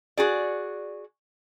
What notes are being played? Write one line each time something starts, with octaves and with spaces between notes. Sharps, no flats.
F#4 G#4 D5